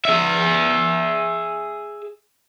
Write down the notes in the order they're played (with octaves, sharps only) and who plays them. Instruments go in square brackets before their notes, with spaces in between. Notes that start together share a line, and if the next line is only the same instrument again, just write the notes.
[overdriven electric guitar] G#4 E5